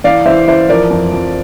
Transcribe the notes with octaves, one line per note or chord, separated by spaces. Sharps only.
E3 D5 F5
E3 C5 E5
E3 C5 E5
F3 A#4 D5
F2
F2